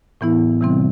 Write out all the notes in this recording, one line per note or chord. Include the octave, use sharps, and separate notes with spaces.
A2 E3 B3 E4
C3 E3 G3 C4